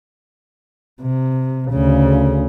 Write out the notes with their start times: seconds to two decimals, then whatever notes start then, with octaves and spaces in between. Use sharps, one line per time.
1.02 C3
1.71 D2 C#3